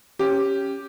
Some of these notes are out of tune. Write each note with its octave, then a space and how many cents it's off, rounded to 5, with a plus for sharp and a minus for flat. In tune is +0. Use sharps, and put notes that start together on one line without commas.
C#4 +0 G4 +0